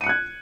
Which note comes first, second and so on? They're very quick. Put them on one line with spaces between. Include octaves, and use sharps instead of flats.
D#7 C#7 F#6 G#6